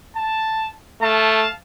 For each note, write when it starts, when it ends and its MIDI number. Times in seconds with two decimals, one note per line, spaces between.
0.15 0.67 81
1.01 1.45 57
1.01 1.50 77
1.01 1.50 81